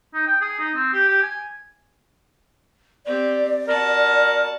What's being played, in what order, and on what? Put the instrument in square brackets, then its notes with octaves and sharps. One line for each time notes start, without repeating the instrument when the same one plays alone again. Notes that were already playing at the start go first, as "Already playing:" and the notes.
[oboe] D#4
G5
G#4
D#4
C4
G4
G4
G#5
[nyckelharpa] C4 G4 [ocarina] D5
[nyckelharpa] F#4 A5 [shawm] A#4